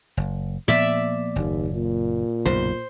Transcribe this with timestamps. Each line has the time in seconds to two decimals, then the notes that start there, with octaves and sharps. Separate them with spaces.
0.17 F#1
0.68 A#2 F3 B3 D5 E5
1.36 F#1 D#2
1.74 A#2
2.46 B1 F#2 C#3 C5